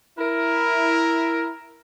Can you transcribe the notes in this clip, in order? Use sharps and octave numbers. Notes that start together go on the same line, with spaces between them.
E4 A#4